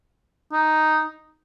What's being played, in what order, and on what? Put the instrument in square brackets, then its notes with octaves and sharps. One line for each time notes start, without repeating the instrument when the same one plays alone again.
[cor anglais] D#4